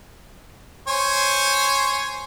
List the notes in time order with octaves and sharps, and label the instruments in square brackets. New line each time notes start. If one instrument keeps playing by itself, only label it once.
[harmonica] C5 C#5 G#5